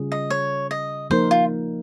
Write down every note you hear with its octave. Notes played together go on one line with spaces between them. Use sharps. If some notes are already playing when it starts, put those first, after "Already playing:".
Already playing: C#3 G3 C#4 F4 G#4
D#5
C#5
D#5
F3 A#3 D#4 A#4 C5
F4